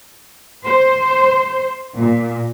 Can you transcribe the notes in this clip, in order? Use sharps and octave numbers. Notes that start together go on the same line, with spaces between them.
C5
A#2